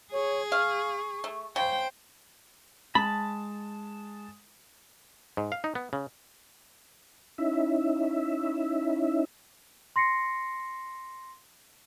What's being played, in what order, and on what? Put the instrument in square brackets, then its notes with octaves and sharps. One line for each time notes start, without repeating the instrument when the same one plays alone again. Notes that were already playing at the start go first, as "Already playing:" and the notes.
[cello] G#4 [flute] C#5
[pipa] F5 [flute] C#6
[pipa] A3
[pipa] C#3 [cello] C5 G5
[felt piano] G#3 [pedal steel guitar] A5 [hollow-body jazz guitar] B5
[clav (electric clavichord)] G#2
F5
D#4
B3
C#3
[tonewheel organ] C#4 D#4 E4 E5
[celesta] C6 A#6 C7 C#7